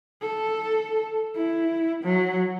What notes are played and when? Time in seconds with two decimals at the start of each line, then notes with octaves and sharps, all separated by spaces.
0.21 A4
1.35 E4
2.04 F#3